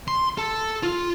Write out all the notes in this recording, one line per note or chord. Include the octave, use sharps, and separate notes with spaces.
C6
A4
F4